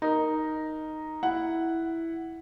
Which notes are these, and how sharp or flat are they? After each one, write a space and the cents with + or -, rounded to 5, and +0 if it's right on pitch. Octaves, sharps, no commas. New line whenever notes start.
D#4 +0 A#4 +0
E4 +0 F#5 +0